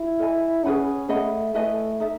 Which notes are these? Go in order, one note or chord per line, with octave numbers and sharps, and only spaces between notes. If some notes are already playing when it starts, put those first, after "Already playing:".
Already playing: E4
A4 D#5 G#5 B5
C#4 G#4 B4 F#5 B5
A3 G#4 D#5 F#5 B5
A3 E4 B4 D#5 G#5
D#4 A4 E5